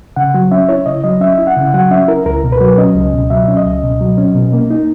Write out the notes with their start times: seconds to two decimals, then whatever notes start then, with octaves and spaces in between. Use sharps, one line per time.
0.16 C#3 F#5
0.34 F#3
0.51 C#4 E5
0.69 E4 C#5
0.86 C#3 D#5
1.04 F#3 D#5
1.21 C#4 E5
1.38 E4
1.47 F#5
1.57 C#3
1.74 F#3 F#5
1.91 C#4 E5
2.08 E4 A#4
2.26 C#2 A#4
2.44 B2
2.52 B4
2.61 F#3
2.78 C#4 D#5
2.96 C#2
3.14 B2
3.30 F#3 E5
3.48 C#4
3.57 D#5
3.66 C#2
3.83 B2
4.01 F#3
4.18 C#4
4.35 B2
4.53 A#3
4.70 D#4